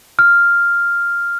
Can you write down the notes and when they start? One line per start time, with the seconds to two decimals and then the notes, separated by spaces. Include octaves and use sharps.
0.19 F6